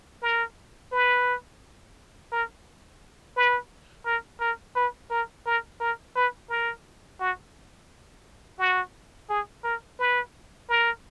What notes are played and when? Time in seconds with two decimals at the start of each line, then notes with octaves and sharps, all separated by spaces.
0.22 A#4
0.92 B4
2.32 A#4
3.36 B4
4.06 A#4
4.41 A#4
4.76 B4
5.11 A#4
5.46 A#4
5.80 A#4
6.16 B4
6.50 A#4
7.20 F#4
8.59 F#4
9.30 G#4
9.64 A#4
9.99 B4
10.69 A#4